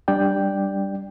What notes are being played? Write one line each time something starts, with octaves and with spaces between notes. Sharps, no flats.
G3 D4 D5 G5